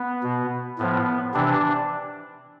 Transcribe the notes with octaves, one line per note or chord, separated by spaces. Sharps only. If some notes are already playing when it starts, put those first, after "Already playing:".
Already playing: B3
B2
A2 F3 B3
C3 E3 D4